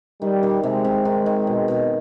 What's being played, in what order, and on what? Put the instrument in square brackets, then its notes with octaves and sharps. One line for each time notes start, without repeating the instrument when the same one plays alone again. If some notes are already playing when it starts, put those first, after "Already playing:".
[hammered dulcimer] D#3 [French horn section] G3
[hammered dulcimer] D#3
[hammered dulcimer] C3 [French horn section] G#3
[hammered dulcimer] C3
D#3
D#3
B2
B2